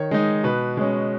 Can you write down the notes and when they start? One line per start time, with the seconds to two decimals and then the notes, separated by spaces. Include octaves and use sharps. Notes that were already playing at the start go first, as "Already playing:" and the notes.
Already playing: D#3 C#5
0.11 G#3 D#4
0.44 B2 B4
0.77 G#3 C#4